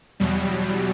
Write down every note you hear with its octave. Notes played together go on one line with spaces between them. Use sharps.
E2 B2 F#3 G3